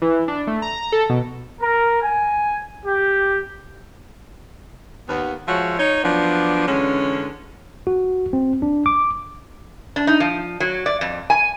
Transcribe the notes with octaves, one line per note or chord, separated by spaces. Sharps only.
E3
D4
A3
A#5
A4
B2
A#4
G#5
G4
D#2 B3
F3 G#3 F#4 C#5 E5
D#4 C#5
F3 F#3 B3 D4
D3 E3 G#3 C#4
F#4
C4
D4
D6
D4
D#4
F3
F#3
D5
F2
G#5